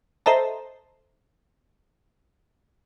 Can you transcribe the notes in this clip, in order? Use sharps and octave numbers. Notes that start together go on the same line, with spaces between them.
A4 C5 D#5 E5 A5 A#5